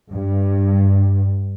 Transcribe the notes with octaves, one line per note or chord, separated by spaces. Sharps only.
G2